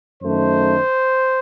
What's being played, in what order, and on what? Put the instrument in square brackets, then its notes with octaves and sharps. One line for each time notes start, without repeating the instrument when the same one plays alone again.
[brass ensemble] F#2 D#3 A3 C5